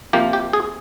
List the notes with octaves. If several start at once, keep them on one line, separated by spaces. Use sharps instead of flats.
C3 F3 A#3 G4
G4
G#4